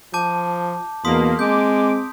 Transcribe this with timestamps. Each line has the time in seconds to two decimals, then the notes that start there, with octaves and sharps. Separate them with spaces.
0.14 F3 A5 D6 G6
1.05 E2 B2 A#3 C6 D#6 B6
1.39 G#3 C4 D6 G6